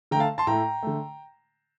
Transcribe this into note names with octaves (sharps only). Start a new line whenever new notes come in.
D3 A3 G5 A#5
F5 A5
A5 C6
A2 A3 G5 A#5
D3 A3